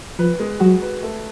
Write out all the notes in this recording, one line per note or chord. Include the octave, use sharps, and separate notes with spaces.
F3 B4
G#3
F#3 F#4
B4
A3